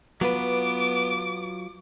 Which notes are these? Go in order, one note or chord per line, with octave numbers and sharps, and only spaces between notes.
F#3 B3 F4 B4 D6